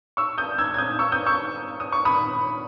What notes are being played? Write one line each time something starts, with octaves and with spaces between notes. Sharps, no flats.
C#6 E6
D#6 G6
E6 G#6
G#6
D#6 G6
C#6 E6
D#6 G6
C#6 E6
D#6
C#6
B5 D#6